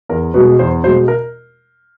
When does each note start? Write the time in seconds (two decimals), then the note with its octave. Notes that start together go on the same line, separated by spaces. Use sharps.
0.09 E2 A#4
0.34 B2 G#3 B4
0.59 E2 C5
0.83 B2 C5
0.88 G#3
1.08 A#4